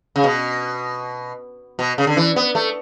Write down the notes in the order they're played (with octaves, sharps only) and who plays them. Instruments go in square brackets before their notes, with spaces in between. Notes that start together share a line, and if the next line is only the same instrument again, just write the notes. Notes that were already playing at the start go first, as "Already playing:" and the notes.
[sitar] C#3
B2
B2
C#3
D3
E3
B3
A3